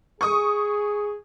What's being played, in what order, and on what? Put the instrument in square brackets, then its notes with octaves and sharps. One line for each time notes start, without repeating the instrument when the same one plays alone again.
[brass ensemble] G#4 [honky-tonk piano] C#6 D#6